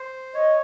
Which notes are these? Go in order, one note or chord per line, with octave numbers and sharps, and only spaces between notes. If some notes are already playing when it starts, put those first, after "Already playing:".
Already playing: C5
C#5 D#5